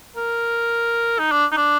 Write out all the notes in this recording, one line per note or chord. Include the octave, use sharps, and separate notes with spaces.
A#4
D#4
D4
D#4
D4